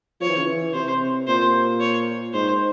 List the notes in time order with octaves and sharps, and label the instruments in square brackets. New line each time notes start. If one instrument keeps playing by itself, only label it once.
[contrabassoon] F3 [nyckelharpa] C#5
[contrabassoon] E3
C#3
E3
[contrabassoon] C3 [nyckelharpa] C5
[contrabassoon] A#2 [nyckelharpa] C5
[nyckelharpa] C#5
[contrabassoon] G#2 [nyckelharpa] C5